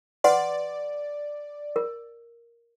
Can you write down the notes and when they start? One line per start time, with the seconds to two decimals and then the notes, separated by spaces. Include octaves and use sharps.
0.24 B4 D5 F#5 C6
1.76 A#4